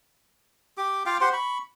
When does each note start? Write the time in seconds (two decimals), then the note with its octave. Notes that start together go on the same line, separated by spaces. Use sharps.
0.78 G4 D6
1.06 F4 F5 G5 D6
1.21 G4 C5 F#5 C6
1.33 B5 C#6